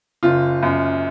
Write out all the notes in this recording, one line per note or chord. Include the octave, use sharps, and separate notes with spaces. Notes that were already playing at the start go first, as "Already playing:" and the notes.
F#1 F4
F#2